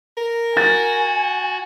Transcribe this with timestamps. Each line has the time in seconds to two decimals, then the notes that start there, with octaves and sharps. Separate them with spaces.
0.17 A#4
0.57 F#4 G#5 A6